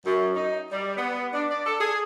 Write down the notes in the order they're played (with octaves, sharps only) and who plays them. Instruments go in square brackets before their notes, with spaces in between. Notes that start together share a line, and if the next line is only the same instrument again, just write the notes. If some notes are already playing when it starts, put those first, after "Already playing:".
[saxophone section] F#2
D#4
G3
B3
D4
D5
A4
G#4